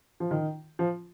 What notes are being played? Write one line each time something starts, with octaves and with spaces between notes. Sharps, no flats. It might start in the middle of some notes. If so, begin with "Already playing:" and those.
F3
D#3
F3